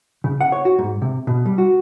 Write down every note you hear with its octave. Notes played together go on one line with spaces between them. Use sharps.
C#3
F#5
C#5
F#4
G#2
C3
B2
G3
F#4